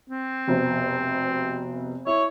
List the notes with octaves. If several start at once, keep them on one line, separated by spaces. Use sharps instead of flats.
C4
F1 B2 C5
E4 C#5